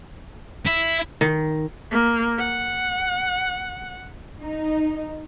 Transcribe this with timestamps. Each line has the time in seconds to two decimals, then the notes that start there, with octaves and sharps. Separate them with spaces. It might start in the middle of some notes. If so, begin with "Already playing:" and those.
0.67 E4
1.21 D#3
1.91 A#3
2.38 F#5
4.41 D#4